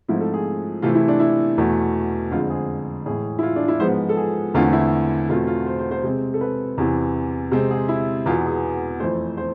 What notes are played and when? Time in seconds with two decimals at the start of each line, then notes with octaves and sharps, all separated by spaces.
0.08 G#2 F3 A3 C4 E4
0.21 A4
0.34 G#4
0.82 C3 E3 A3 C4 F4
0.95 E4
1.08 D4
1.20 E4
1.58 E2 B2 A3
2.31 F2 D3 G#3 C4 F4
2.50 G#4
3.06 A2 E3 G#3 G#4
3.39 E4
3.43 F4
3.56 D4
3.68 E4
3.80 G#2 F3 G#3 B3 C5
4.09 A4
4.17 G#4
4.54 E2 D3 A3 C4 F4
4.73 E4
5.29 E2 B2 A3 C4 F4
5.47 F4
5.66 C5
5.79 C5
5.91 C5
6.03 C3 G#3 C4
6.34 A4
6.41 B4
6.78 E2 C3 E3
7.52 C3 G#3 C4
7.71 G#4
7.89 E4
8.26 E2 B2 B3 F4
8.45 G#4
9.00 F2 E3 A3 C5
9.37 C5